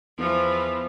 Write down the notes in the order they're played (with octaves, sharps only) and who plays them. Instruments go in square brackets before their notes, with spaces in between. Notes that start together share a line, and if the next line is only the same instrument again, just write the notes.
[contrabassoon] E2 [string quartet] E3 F3